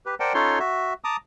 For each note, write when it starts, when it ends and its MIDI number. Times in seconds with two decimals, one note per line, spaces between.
0.06 0.15 67
0.06 0.15 71
0.20 0.33 70
0.20 0.33 72
0.20 0.33 74
0.20 0.33 78
0.20 0.33 79
0.20 0.33 81
0.34 0.59 61
0.34 0.59 63
0.34 0.59 65
0.34 0.59 69
0.34 0.59 73
0.34 0.59 84
0.59 0.93 66
0.59 0.93 76
1.04 1.17 81
1.04 1.17 82
1.04 1.17 86
1.04 1.17 87